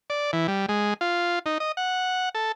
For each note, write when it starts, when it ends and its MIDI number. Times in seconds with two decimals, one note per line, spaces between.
0.10 0.31 74
0.33 0.47 52
0.48 0.66 55
0.69 0.94 56
1.01 1.39 65
1.46 1.58 63
1.60 1.72 75
1.77 2.29 78
2.35 2.52 69